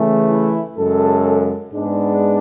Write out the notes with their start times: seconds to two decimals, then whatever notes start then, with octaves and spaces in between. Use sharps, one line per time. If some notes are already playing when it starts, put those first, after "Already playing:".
Already playing: C#3 E3 A3
0.30 E4
0.77 F#2 C#3 G#3 A4
1.73 G#2 G#3 B3 D4